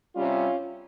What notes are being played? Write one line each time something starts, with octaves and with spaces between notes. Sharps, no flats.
C3 G3 C#4 F4